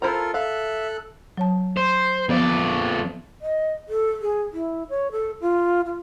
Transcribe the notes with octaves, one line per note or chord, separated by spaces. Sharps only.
E4 F4 A4 A#4 C5 A#5
A4 E5 F5 F#6
F#3 C#5 A5
C5
F2 F3 B3 D5
D#5
A4
G#4
E4
C#5
A4
F4
F4